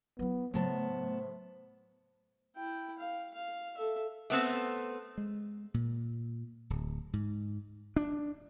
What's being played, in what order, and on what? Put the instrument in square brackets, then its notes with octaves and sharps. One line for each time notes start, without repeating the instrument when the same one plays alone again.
[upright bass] F#3 E4 [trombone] B3
[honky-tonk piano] A2 [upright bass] C#3 [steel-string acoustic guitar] F#3 B3 A5 [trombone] C5
[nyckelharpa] E4 G5
F5
F5
A4 E5
[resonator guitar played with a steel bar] A3 B3 C4
[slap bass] G#3
A#2
D1
G#2
D4